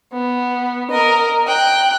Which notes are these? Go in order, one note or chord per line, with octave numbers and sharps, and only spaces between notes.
B3
A#4 D#5
G5 F#6